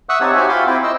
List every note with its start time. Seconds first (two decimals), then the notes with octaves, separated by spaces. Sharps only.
0.09 E5 F#5 C#6 D#6 E6 F#6
0.21 C4 D#4 G4 C#5 F#5 A5
0.36 F#4 G4 C5 E5 F#5 G#5
0.49 F4 G5 B5 C6 D6
0.67 C4 E4 G5
0.83 C5 D#5 E6